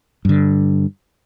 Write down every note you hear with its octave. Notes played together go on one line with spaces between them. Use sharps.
G2 D3